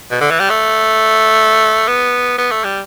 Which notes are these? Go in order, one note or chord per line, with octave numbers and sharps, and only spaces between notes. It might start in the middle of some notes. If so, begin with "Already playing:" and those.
B2
D3
E3
G3
A3
B3
B3
A3
G3